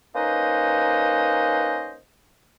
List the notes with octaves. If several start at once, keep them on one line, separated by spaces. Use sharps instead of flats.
A#3 C#4 D#4 B4 C5 D#5